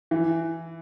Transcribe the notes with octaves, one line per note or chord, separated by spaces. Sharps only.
E3